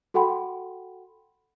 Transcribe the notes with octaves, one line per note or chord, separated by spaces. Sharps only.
F#4 A4 F#5 G5 B5 C6